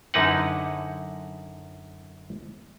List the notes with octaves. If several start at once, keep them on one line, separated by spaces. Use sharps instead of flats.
F#2 D3 D#4 E4 B4 F#5